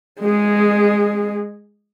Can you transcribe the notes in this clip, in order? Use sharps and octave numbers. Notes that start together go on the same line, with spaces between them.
G#3 G#4